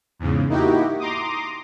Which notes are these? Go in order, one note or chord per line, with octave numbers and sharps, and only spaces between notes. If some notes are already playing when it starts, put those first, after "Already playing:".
E2 G#2 C#3
A#3 D#4 E4 F#4 G4
A#5 C6 D6 D#6